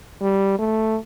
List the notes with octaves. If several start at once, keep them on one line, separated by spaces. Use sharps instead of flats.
G3
A3